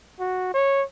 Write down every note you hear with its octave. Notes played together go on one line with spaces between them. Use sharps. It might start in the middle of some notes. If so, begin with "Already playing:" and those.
F#4
C#5